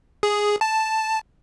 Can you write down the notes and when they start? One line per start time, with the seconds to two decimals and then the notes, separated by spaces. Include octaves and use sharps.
0.23 G#4
0.61 A5